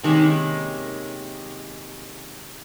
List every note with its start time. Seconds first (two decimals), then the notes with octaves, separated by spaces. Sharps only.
0.03 C3 D#3 G#3 A#3 C#4